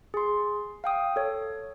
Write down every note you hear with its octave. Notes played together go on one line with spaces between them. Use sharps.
G#4 C6
F5 G5 D#6
A4 C#5